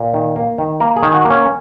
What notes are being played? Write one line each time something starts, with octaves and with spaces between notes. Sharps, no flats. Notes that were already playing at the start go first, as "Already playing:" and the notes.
Already playing: A#2
D#3
A#3
D#3
A#3 A#4
G#4
D#3
F#4
A#3
C#4